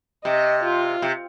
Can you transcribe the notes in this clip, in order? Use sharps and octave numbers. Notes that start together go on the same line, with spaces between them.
C3 D#5
F4
C3